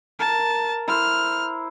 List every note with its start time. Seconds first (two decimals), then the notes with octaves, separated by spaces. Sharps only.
0.19 A#4 A5
0.88 E4 C5 F6